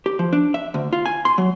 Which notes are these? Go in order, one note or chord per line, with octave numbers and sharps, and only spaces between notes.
G4
F3
D4
E5
D2
F4
G#5
C6
F#3